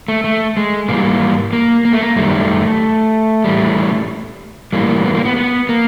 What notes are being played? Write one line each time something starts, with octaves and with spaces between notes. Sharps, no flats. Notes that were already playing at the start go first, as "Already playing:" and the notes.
A3
A3
G#3
G#2 E3 G3 A#3
A#3
A#3
A3
A#3
F#2 D#3 G3 A3
A2 E3 G3
A2 E3 G3 A#3
B3
A#3
B3
B3
A#3